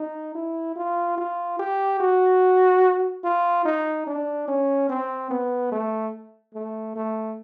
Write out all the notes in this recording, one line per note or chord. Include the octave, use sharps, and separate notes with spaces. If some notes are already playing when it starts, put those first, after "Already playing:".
Already playing: D#4
E4
F4
F4
G4
F#4
F4
D#4
D4
C#4
C4
B3
A3
A3
A3